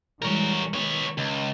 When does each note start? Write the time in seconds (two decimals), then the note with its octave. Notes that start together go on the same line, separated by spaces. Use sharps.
0.22 E3 G3 G#3 A#4 C#5
0.74 D#3 B3 C#5
1.18 C#2